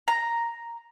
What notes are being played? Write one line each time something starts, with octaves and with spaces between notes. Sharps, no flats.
A#5